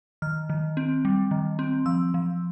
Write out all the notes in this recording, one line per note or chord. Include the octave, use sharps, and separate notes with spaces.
D#3 F6
D#3
C4
G3
D#3
C4
F3 E6
F3